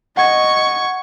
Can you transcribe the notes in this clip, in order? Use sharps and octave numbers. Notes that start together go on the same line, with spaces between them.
D#5 F#5 C#6 G#6